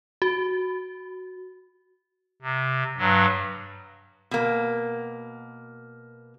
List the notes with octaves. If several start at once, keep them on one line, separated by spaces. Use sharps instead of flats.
F#4
C3
G2 F#3
B2 A#3